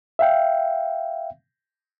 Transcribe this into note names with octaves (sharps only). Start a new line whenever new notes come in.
E5 F5 G5